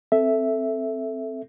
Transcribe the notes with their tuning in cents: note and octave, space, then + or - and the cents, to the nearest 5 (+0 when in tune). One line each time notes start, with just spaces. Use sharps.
C4 +0 A4 +0 E5 +0